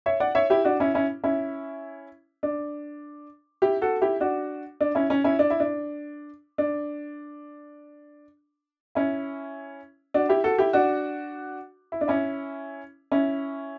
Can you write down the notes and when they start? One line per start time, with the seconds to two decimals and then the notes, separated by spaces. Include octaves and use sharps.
0.06 C#5 E5
0.20 D5 F#5
0.35 C#5 E5
0.50 E4 G4
0.65 D4 F#4
0.80 C#4 E4
0.94 C#4 E4
1.24 C#4 E4
2.43 D4
3.62 E4 G4
3.82 F#4 A4
4.01 E4 G4
4.20 D4 F#4
4.81 D4
4.95 C#4 E4
5.10 C#4
5.24 C#4 E4
5.39 D4
5.50 E4
5.60 D4
6.58 D4
8.95 C#4 E4
10.14 D4 F#4
10.29 E4 G4
10.44 F#4 A4
10.58 E4 G4
10.73 D4 F#4
11.92 E4
12.01 D4
12.08 C#4 E4
13.12 C#4 E4